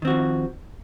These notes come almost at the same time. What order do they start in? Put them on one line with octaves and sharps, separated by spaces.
D#3 C4 F#4 F3